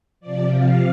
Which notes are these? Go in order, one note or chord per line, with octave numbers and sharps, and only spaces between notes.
C3 F3 D5
F5